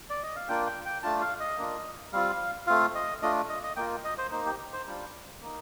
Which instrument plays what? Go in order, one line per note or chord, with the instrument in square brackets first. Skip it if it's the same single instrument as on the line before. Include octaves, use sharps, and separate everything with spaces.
[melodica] D5
D#5
F5
A#3 D4 F4 G5
G5
G5
A3 D4 F4 A5
F5
D#5
A#3 D4 F4
G3 C4 F4 F5
A3 C4 F4 F5
D#5
A3 D4 F4 D#5
D#5
D#5
A#3 F4 G5
D#5
C5
A#3 D#4 C5
G4
C5
G3 D4 F4
A#3 D#4